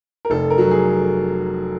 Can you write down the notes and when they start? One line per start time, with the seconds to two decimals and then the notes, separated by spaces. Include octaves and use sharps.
0.25 A#4
0.30 F1 A4
0.50 A#4
0.58 F#3
0.71 G#4